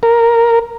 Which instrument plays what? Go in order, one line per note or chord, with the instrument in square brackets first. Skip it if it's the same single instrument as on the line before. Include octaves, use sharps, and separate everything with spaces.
[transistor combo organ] A#4